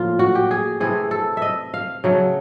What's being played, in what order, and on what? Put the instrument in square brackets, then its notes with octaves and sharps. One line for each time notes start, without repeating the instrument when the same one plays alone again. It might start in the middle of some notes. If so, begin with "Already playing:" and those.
Already playing: [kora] A2 F3 A#3 F4
F#4
G4
G#4
C3 E3 A3 C4 G#4
A4
D#5 E5
F5
C#3 F#3 A3